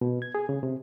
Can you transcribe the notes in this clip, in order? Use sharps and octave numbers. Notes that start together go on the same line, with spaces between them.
B2
G#6
G#4
C#3
C3